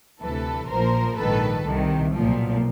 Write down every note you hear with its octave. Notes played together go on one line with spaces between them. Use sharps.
D2 C3 E3 A4 B4
A#1 A#2 F3 A#4 C5
A#1 G#2 D#3 A4 B4
C2 C3 D#3
B1 A#2 F3